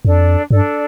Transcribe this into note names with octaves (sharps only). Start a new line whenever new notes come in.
F2 D4 A4 D5
G2 D4 A4 D5